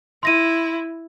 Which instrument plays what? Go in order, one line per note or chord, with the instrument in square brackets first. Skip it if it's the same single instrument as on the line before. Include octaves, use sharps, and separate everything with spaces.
[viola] E4 [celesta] C6 A#6 D#7